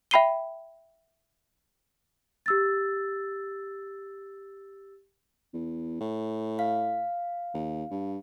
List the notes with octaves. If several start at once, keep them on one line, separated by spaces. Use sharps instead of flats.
E5 G5 B5 C7 D#7 G7
G4 E6 A6
E2
A2
F5
D#2
G2